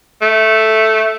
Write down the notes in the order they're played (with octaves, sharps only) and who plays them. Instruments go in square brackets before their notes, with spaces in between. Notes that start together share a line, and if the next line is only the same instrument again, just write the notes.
[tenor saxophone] A3